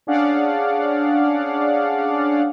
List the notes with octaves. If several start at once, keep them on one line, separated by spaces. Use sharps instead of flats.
C#4 D4 G#4 D5 F5 F#5